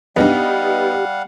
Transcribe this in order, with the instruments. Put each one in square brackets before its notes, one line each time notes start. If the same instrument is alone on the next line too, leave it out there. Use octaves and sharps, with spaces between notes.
[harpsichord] E2 G2 [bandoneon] G3 F5 F#5 [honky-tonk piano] B3 D#4 [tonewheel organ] G4